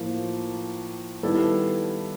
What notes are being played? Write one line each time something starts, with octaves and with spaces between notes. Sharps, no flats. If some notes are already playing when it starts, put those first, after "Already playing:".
Already playing: A2 F3 A#3
D#3 G3 B3 E4 A4